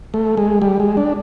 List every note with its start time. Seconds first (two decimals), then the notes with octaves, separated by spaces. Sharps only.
0.14 A3
0.37 G#3
0.62 G3
0.80 G#3
0.97 D4